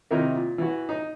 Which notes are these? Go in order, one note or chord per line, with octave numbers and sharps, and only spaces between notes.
C3 D#3 D#4 E4 A#4
A#2
E3 F#4
D#4